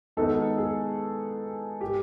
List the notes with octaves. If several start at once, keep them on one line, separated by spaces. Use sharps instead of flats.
D#3 G#3 B3 D#4 F#4 A4
G#4
G4